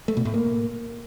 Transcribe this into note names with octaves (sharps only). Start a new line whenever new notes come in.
A3
B2
A2
A#3